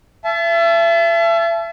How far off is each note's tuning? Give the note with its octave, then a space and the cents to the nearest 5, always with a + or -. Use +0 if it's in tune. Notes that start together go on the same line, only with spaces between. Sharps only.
E5 +35 A5 -25